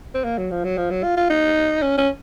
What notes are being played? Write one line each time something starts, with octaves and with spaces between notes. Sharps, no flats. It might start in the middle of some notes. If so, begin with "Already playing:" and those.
C4
A#3
F#3
F3
F#3
F3
F#3
F4
F4
D#4
C#4
C#4